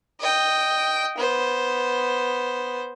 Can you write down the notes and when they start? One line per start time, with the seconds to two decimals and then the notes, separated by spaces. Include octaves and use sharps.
0.20 D#5 G5
1.17 B3 C5